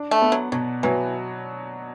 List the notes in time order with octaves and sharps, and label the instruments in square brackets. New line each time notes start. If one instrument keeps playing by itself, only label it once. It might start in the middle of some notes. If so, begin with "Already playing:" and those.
Already playing: [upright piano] D4
[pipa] A3
[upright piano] B3
[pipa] F#3
[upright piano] B2 [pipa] F#3
[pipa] E3 [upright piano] F#3